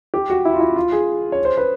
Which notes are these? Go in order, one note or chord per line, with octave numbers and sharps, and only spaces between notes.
G4
F#4
E4
F4
E4
F4
G#4
C#5
C5
B4